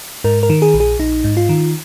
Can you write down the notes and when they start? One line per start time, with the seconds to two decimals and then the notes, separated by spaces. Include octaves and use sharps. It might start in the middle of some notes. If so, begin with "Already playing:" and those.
0.24 G#2 A#4
0.43 A#4
0.50 D#3
0.62 G#4
0.74 A#1
0.80 G#4
0.99 A#1 D#4
1.24 G#2
1.37 F4
1.49 D#3